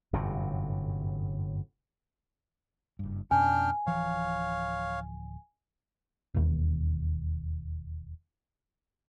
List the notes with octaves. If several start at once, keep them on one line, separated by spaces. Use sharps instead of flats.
G1 F#2 A2 C3
F#1 G2
F2 B2 C#4 D4 G5 G#5 F6
D1 E3 F3 C#5 F5
E1 D#2